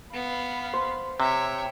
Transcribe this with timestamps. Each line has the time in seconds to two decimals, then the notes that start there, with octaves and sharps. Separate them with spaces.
0.14 B3 F5 B5
0.73 C5
1.20 C3 C#5 E5 G5